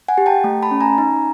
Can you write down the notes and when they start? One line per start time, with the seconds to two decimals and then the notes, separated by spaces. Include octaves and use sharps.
0.08 F#5 G#5
0.18 G4
0.26 G5 A5
0.44 A3
0.63 A5 B5
0.71 C#4
0.81 G#5 A#5
0.98 D#4